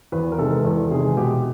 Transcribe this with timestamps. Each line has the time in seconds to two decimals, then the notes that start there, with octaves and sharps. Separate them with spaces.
0.12 E2 B4
0.32 A#4
0.38 C3 D#3 G#3 A4
0.64 E2 A4
0.90 C3 D#3 G#3 G#4
1.17 B2 G4